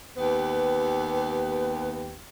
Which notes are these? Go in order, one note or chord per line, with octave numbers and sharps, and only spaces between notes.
D#2 B3 G4 B4